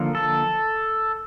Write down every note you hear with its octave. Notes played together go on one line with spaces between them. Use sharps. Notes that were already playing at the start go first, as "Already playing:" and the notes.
Already playing: D3 F3 A#3
A4